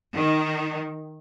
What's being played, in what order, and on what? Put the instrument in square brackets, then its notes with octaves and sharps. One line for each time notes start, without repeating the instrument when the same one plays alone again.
[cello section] D#3